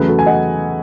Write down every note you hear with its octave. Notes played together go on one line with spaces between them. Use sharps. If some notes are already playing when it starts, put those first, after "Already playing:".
Already playing: E2 C#3 F#3 A3 G#4 B4
F#4 A4
G#5
D#5 F#5